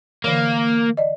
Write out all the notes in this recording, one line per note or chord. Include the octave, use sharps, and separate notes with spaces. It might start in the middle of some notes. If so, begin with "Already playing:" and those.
D3 E3 A#3 C#5
D5 D#5